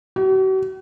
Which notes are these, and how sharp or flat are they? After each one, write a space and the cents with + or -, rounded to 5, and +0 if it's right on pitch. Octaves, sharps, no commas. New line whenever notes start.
F#4 +45